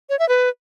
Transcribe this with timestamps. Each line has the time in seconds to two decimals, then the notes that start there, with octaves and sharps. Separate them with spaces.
0.10 C#5
0.19 E5
0.29 B4